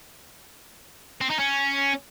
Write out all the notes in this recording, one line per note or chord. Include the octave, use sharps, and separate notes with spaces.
C4
D#4
C#4